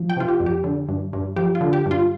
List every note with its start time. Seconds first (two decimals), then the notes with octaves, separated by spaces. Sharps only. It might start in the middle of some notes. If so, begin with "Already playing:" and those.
Already playing: F3
0.10 G5
0.17 C3 F4
0.28 G4
0.40 F2
0.46 G4
0.64 D3
0.88 G2
1.13 G2
1.36 F3 G4
1.55 F4
1.61 D3
1.73 G4
1.86 G2
1.91 F4